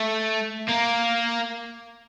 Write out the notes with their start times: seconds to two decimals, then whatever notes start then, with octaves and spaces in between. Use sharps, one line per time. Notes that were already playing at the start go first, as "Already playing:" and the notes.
Already playing: A3
0.69 A#3